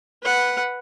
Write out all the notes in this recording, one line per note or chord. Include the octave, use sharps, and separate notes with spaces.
B4 F#5